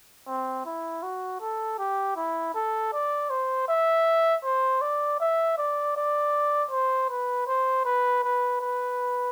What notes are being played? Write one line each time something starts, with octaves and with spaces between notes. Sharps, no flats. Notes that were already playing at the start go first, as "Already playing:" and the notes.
C4
E4
F#4
A4
G4
E4
A4
D5
C5
E5
C5
D5
E5
D5
D5
C5
B4
C5
B4
B4
B4